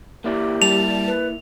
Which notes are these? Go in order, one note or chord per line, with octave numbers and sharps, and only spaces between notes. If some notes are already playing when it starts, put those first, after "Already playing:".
A#3 E4 G4 D5
G3 A5 F7
B4